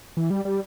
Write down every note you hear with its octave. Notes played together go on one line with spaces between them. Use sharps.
E3
G3
G3